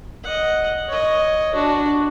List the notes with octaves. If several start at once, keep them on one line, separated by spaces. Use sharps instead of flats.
D#5 F#5
C#5 D#5
D4 F#4